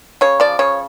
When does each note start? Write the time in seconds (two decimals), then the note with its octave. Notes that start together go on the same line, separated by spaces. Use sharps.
0.21 C#3 C#5
0.40 F3 D5
0.59 C#3 C#5